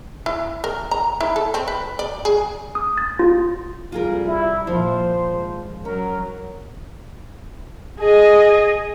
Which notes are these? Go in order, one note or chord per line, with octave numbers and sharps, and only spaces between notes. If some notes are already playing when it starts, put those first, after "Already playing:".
E4
A#4
A#5
E4
A4
C4
B4
D5
G#4
D#6
A6
F4
C2 G3 F4 G#4 A#4
E4
A#2 F3 C5
G#1
F#3 C#4 A#4
G#4 D#5